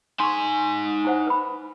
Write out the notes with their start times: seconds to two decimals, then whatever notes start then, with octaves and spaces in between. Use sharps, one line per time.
0.20 D#4 G#5 C6 C#6
1.05 E4 C5 F#5
1.27 B4 B5